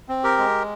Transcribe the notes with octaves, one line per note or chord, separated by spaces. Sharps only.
C4
G4 A#4
G#3